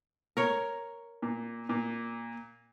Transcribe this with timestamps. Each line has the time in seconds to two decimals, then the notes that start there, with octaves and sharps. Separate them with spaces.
0.37 A#4 C#5
1.22 A#2
1.69 A#2